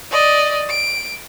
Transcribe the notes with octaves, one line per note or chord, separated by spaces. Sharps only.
D5 D#5
D7